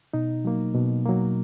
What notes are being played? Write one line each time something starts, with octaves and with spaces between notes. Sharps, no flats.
B2 D#4
F#3 A#3
B2
F#3 A#3